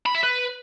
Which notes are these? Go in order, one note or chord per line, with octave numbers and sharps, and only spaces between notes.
B5
E5
B4